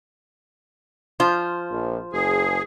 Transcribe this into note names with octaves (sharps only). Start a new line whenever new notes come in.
F3 F4 C5
A#1
F#1 G#4